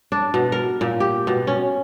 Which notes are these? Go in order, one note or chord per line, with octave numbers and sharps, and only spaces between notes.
D4
B2
A#4
A#2
G4
B2
C#4